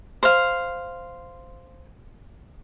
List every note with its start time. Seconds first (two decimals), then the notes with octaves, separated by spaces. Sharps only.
0.23 C5 F5